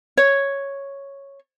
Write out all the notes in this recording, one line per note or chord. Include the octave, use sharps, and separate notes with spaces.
C#5